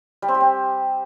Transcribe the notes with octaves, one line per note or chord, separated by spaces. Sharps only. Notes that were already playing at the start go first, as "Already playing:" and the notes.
G3
C4
G4
C4